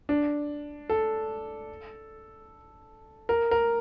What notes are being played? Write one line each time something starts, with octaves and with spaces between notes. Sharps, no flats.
D4
A4
A#4
A#4